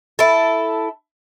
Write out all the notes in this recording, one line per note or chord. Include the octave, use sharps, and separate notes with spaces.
E4 A4